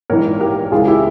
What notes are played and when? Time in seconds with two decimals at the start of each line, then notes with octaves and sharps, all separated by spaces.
0.10 A#1 G#2 E3 A#4 C#5
0.41 G4 A#4
0.72 C#2 C#3 E3 F4 G#4
0.87 E4 G4